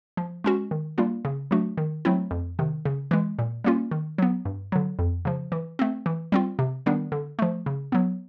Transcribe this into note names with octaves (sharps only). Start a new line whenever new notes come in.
F3
G#3 C#4 F#4
D#3
G3 A#3 D4 F4
C#3
F#3 A3 D4 F#4
D#3
F#3 A3 C4 E4
F2
C3 D#3
C#3
E3 G#3
A#2
G3 A#3 C#4 F4
D#3
F#3 B3
G2
D3 F#3
F2
C#3 F3
E3
A3 C4
E3
G3 C4 F4
C3
D#3 G3 B3 D4
D3
F3 A3
C#3
F#3 B3